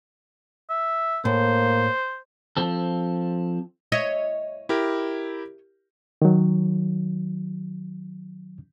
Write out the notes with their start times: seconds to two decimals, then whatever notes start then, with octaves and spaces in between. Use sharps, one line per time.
0.70 E5
1.25 A2 A#3 C5
2.57 F3 C4 A4
3.92 C#5 D#5 E5
4.69 E4 G4 A#4
6.22 D#3 F#3